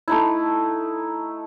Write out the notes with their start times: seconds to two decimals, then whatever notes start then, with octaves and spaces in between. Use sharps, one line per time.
0.08 A3 D#4 E4